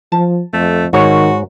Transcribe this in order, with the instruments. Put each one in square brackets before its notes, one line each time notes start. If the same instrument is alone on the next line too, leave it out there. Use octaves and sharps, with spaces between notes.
[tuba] F3 [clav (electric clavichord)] A5
[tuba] F2 [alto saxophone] A3
[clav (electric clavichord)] G#2 C#5 [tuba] D#3 [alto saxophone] F#4